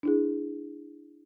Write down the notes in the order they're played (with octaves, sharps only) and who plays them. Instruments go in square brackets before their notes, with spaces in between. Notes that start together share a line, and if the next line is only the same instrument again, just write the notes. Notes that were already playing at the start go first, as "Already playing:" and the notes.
[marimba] D4 E4 G#4